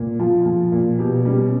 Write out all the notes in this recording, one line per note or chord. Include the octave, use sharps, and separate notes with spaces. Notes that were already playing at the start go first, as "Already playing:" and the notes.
Already playing: A#2
F3 F4
F3
A#2
B2 G4
G3 C#4